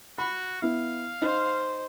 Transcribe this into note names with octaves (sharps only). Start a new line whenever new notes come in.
F#4 B5
B3 E4 F5
D#4 C5